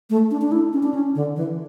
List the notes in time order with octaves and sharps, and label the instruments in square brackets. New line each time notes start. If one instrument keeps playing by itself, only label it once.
[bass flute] A3
D4
D4
E4
C#4
D4
C#4
D3
E3